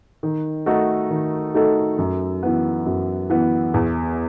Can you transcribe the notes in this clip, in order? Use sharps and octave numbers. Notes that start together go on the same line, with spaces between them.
D#3
A3 D#4 F#4 A4
D#3
A3 D#4 F#4 A4
F#2
E3 B3
F#2
E3 B3
E2